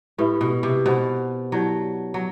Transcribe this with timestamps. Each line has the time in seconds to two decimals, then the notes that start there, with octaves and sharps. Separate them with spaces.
0.18 A2 G4 B4 E5 B5
0.41 B2
0.63 C3
0.85 B2 G4 C5 F#5 B5
1.52 F#3 E4 G4 D5 F#5 A5
2.14 F#3